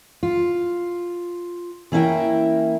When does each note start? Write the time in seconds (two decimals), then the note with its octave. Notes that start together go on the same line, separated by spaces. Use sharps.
0.23 F4
1.92 E3 A#3 C#4 E4 A#4 G5